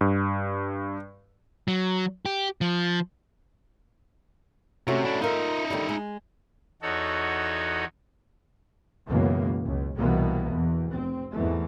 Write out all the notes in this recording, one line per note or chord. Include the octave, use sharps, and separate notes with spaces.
G2
F#3
G4
F3
C3 A3 C#4 F#4
D4 E4
D#4 F4 A#4 E5
D3 D#3 G3
G#3
E2 D#4 F#4 A4 C#5
C#2 F#2 B2 E3 A#3 B3
C#2
C2 B2 E3 A#3 B3
E2
F1 C4
E2 G#2 E3 A3